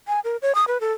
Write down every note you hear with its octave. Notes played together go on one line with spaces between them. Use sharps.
G#5
A#4
C#5
D#6
B4
A4